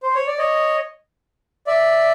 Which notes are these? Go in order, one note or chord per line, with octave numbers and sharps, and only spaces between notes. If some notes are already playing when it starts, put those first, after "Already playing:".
C5
C#5
D5
C#5 D#5
D5 E5